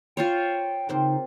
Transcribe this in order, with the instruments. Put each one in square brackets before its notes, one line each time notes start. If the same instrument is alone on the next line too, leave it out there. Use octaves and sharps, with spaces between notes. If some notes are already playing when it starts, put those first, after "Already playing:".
[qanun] F4 C5 C#5 [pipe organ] G5
[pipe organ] C#3 D#4 [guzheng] A#3 C4 C5